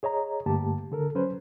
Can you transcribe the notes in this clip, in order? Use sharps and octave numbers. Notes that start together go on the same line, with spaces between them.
G#4 C#5 D#5 A#5
G2 D3 A3 A#3 G4 A5
D3 A4 A#4
F#3 C#4 B4 C5